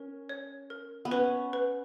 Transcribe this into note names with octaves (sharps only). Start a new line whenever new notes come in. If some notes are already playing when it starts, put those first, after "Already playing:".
Already playing: C#4 A#4
C#5
A#4
B3
C#4 B4
B4